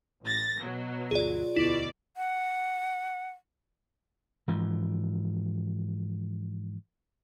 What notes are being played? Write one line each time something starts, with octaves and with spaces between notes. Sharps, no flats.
A1 A6 A#6
B2 F#3
G1 D2 F4 G#4 D5
E1 D2 B2 E4 D5
F#5
G#2 E3 F3